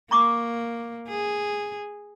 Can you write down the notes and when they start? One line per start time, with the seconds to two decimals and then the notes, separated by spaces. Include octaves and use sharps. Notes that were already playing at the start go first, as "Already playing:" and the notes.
0.11 A#3 A#5 C#6 D6
1.09 G#4